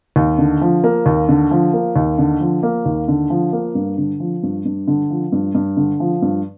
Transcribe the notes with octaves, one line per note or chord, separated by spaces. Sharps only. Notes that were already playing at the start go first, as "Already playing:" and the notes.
D#2
D3
F3
A#3
D#2
D3
F3
A#3
D#2
D3
F3
A#3
D#2
D3
F3
A#3
G2
D3
F3
G2
G2
D3
F3
G2
G2
D3
F3
G2